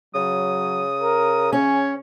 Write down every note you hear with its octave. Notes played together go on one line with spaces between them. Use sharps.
C#3 F#3 D#6
A#4
C#4 C#5 G#5